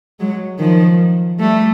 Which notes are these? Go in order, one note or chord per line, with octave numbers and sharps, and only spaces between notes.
F#3 G#3
D#3 F3
G3 A3